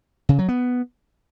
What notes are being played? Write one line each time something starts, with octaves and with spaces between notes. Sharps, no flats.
C#3
F#3
B3